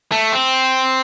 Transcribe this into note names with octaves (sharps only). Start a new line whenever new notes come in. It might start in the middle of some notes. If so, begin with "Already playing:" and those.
A3
C4